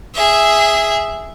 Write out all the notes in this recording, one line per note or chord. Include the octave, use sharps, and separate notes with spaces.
G#4 E5